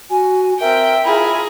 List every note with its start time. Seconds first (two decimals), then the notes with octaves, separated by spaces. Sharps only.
0.10 F#4 G#5
0.60 C4 A#4 E5 G5
1.05 E4 F4 G#4 A#5